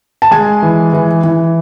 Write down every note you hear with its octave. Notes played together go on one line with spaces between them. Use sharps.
A5
G#3 G#5
E3
E3
E3